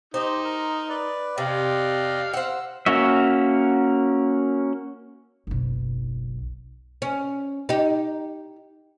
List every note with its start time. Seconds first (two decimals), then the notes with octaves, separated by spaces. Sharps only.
0.14 D#4 G4 C5
0.45 A#4
0.89 B4 D5
1.38 C3 D5 D#5 F5 G5
2.34 C5 F#5 E6
2.86 A#3 C#4 F#4 E5
5.47 F#1 B1
7.02 C#4
7.69 D#4 G4